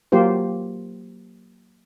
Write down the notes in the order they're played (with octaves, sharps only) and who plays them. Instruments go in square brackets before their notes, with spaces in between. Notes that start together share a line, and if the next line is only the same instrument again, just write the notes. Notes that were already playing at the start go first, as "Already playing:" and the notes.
[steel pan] F#3 A#3 F4 G4 C5